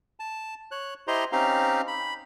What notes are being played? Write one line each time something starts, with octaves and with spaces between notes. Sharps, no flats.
A5
C#5 F#6
E4 G4 C5 D#5 A#5 C6
C4 C#4 D#4 G4 F5 A#5
B5